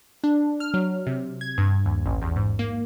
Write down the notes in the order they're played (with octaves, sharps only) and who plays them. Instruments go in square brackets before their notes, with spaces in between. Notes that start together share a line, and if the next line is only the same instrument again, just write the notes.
[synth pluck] D4
F6
F#3
C3
G#6
G2
D#2
A1
E2
G#2
A#3